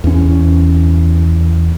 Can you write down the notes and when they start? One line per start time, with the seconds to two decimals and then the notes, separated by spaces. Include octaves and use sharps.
0.04 E2 C#4